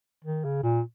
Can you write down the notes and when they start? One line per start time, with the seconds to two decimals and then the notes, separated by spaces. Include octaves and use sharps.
0.24 D#3
0.44 C#3
0.63 A#2